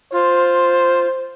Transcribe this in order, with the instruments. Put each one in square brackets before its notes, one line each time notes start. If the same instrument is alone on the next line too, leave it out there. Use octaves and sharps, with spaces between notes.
[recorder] F4 [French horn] C5